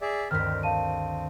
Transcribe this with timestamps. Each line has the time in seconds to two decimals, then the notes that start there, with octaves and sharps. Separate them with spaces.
0.01 G#4 D5 E5
0.31 D2 G2 D#3 C4 F6 B6
0.63 F5 A5 D#7